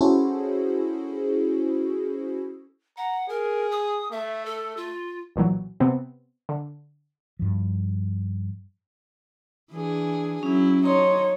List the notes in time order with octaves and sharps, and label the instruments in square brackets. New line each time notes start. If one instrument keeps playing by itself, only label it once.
[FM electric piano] C#4 E4 F#4 G#4 A4 C5
[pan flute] F#5 [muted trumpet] A#5
[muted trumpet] G#4 [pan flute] A#4
[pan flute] D#6
[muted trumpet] A3 [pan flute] E5
[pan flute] A4
F4
[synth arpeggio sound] B1 A#2 E3 F#3
C3 B3 C4
D3
[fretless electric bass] G2 F3
[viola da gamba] E3 D4 G#4
[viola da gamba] F#3 E4 [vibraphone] C#4
[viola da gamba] D#4 [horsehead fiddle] C#5 [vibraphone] C6